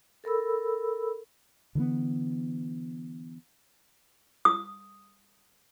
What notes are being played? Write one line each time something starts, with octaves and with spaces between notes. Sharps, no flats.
A4 A#4 B5 E6
D3 E3 G3 B3
D#6